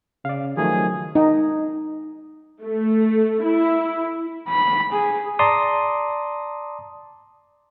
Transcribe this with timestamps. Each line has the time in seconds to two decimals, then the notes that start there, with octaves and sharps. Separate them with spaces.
0.25 C#3 D5 F5
0.57 D#3 F3 F#3 A3 G#4
1.15 D#4
2.62 A3
3.43 E4
4.49 B5
4.93 G#4
5.39 D5 A5 A#5 C6 D6 D#6